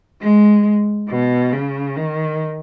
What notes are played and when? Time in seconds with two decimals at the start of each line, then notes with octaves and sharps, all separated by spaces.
0.21 G#3
1.09 B2
1.52 C#3
1.96 D#3